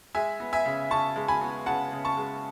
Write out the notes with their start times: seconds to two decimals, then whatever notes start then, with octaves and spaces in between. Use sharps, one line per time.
0.15 G#3 E5 G#5
0.40 B3
0.53 E5 G#5
0.66 C#3
0.91 C#3 A5 C#6
1.16 G#3
1.28 G#5 B5
1.41 B3
1.66 C#3 F#5 A5
1.92 C#3
2.05 A5 C#6
2.17 G#3